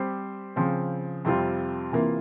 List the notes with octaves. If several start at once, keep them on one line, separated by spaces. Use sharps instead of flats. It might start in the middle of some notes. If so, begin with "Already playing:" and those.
Already playing: G3 C4 G4 C5
C#3 F3 C4
F2 C3 G3 C4 F4
C3 E3 A#3 F4